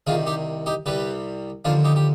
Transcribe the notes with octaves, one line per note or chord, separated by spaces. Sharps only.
C2 C3 D#3 F4 G#4
D#4 G4
D#4 G4
C2 C3 G3 G4 B4
D#2 D3 F3 D4 F4
D#4 G4
G4